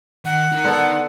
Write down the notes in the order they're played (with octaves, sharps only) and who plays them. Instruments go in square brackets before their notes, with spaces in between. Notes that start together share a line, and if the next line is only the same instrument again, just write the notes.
[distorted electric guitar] D#3 [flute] F#5
[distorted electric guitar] D#4 A#4
[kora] D3 B3 A4